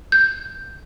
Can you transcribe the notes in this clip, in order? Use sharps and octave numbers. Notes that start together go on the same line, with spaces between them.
G6